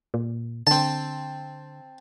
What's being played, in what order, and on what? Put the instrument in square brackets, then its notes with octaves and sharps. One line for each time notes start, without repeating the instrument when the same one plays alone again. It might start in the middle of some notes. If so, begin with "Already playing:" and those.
[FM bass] A#2
[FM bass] D3 [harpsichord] C4 A5